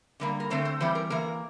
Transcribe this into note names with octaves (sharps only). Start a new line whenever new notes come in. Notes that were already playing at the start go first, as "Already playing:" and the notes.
D3 G3 A#3 A#4
A#4
D3 A3 C4 C5
C5
E3 G3 C4 C5
A#4
E3 A#3 A#4